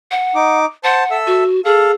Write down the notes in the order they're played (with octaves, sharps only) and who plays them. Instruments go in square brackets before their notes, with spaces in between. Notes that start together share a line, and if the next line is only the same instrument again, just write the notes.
[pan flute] F#5
[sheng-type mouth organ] D#4 D6
[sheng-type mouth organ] C5 A5 [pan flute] F#5
[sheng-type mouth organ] A4 E5 E6
[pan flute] F#4
[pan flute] G#4 [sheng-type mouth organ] A4 F5